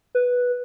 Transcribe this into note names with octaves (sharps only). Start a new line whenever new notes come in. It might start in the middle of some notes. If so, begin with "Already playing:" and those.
B4